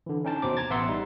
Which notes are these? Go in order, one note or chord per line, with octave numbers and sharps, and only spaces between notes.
D3 E3
C#4 D#4 G5 A5
D#2 B2 C5 D6
A#5 G#6 A6
A1 B3 E5 F#5 C6 E6
G3 D#4